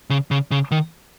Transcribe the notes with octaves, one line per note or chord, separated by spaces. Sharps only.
C#3
C#3
C#3
D#3